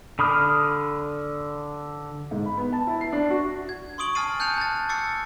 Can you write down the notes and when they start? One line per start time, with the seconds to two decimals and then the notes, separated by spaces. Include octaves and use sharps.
0.19 D3 B5 D6 D#6 F6
2.31 G#2
2.46 B5
2.57 B3
2.73 A5
2.87 E4
3.01 C7
3.13 D4
3.30 F#4
3.69 G#6
3.98 C6 C#6 D#6 D7 F#7
4.15 G#5 A5 F6 A6 C7 D#7
4.39 A5 F#6 G6 A6 C#7 F7
4.58 A5 A6
4.89 D6 E6 A6 C7 C#7